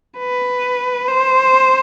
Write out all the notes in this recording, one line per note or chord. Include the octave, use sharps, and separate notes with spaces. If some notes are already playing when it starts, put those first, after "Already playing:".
B4
C5